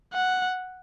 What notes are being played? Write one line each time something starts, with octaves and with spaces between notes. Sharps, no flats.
F#5